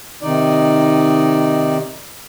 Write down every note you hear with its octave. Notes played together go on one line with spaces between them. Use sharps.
C3 D#3 D#4 D5